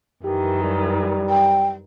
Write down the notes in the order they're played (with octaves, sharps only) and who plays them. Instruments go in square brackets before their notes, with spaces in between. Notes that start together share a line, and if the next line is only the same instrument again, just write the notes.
[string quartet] F#2 D#3 E3 [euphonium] G4
[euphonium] G3
[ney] G5